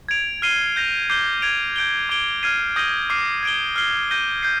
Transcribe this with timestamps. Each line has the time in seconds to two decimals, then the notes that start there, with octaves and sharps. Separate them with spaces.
0.09 G#6 D7 F7
0.42 F6 C7 D#7 G7
0.76 G6 A#6 F7
1.10 D6 G6 C7 G7
1.42 G#6 D7 F7
1.76 G6 D7 G7
2.09 D6 G#6 D7 G7
2.43 F6 G#6 C7 D#7
2.76 D#6 G6 A#6 D#7 G7
3.10 D6 F6 C7 D#7
3.43 G#6 D7 G7
3.76 F6 C7 G7
4.10 G6 A#6 D#7 G7
4.43 G6 C7